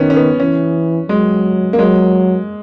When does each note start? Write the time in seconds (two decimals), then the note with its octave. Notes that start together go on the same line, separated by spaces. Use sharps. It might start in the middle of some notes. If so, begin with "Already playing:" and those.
Already playing: D#3 B3 C#4
0.10 C#4
0.17 B3
0.40 E3 C#4
1.09 F#3 G#3
1.73 A#3
1.78 F#3 G#3